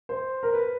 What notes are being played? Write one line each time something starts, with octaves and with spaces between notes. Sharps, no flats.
C5
A#4
B4